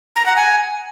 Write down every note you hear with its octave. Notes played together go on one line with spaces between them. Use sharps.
A#5
F#5
G#5